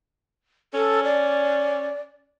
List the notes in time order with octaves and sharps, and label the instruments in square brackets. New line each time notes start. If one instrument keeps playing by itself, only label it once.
[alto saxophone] C#4 [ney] A4
[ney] D5